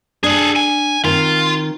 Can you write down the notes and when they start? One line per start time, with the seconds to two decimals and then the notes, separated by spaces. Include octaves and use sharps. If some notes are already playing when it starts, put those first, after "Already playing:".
0.24 D4 G#4 A4
0.56 G#5
1.05 D#3 C4 F4